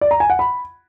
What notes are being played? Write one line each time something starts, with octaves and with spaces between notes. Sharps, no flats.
D5
A#5
G#5
F#5
B5